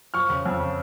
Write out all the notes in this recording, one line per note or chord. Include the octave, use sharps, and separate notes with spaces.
F3 C#6 F6
C#3
F2
C#3